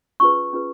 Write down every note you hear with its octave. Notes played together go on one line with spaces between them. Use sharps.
C#4 F4 G#4 B4 C#6
C#4 F4 G#4 B4